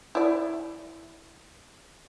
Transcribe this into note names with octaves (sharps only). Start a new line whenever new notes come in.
E4 D5